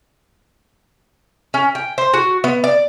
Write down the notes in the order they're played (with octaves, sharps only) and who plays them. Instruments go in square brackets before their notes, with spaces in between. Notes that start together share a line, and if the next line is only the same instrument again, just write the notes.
[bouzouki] C#4
G5
C5
F#4
B3
D5